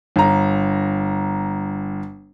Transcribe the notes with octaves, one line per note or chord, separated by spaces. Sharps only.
G1 A#5